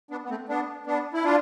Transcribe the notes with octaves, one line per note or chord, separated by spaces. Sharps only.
B3 D4
B3
A3 C4
B3 D4
B3 D4
E4
D4 F4